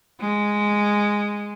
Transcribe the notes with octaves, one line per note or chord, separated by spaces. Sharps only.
G#3